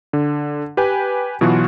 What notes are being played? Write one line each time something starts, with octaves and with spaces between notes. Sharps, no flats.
D3
G4 B4 G5 G#5
B2 E3 F#3 F4 F#4